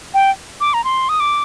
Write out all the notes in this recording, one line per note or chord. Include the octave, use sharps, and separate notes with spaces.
G5
D6
A#5
C6
D#6
D6